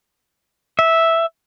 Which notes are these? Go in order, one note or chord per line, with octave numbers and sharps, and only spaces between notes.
E5